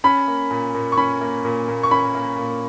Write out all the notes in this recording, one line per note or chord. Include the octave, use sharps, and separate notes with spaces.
C#4 B5
A#3
A#2
A#2
C#6
C#4 B5
A#3
A#2
A#2
C#6
C#4 B5
A#3
A#2